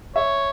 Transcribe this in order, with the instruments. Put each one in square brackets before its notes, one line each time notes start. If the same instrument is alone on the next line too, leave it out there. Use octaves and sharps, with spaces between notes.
[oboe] C#5 [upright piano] E5